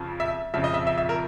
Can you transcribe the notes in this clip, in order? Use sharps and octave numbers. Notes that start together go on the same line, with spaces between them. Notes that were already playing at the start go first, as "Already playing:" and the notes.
Already playing: F2 C#3 F3
E5
F2 C#3 F3 E5
D#5
E5
E5
E5
A#4